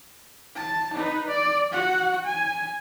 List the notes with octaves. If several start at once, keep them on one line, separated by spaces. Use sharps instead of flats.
A5
D#4 B4
D5
F#4 F#5
G#5